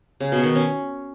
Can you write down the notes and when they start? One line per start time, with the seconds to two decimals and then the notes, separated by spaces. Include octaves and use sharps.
0.20 C#3
0.32 B2
0.44 D#3
0.55 C#4